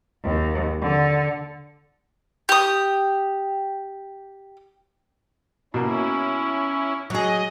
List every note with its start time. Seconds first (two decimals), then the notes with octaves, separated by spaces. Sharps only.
0.24 D#2
0.82 D3
2.49 G4 D#6
5.74 B2 A#3 C#4 E4
7.10 F#3 G#4 D#5